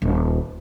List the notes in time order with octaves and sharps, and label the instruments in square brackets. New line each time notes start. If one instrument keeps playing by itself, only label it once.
[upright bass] D#1